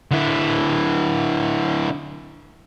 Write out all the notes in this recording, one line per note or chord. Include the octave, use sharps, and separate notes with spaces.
D3 E4